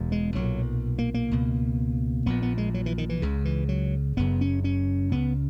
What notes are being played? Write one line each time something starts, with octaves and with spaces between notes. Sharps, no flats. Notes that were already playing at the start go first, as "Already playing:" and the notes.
Already playing: E1 E2 B2
G#3
B1 A#2 F#3
A#3
A#3
C#2 B2
A#1 A#2 B3
B3
G#3
F#3
E3
D#3
E3
C#2 C#3
E3
F#3
F#1 F#2 C#3 B3
C#4
C#4
C#2 C#3 B3